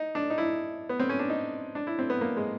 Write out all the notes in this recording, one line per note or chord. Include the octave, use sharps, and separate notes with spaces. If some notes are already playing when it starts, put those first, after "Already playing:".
Already playing: D#4
D4
D#4
E4
B3
C4
C#4
D4
D#4
D4
E4
C4
B3
A#3
G#3